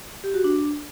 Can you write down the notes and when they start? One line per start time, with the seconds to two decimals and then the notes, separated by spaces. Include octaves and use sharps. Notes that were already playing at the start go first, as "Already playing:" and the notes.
0.24 G4
0.34 F#4
0.44 D4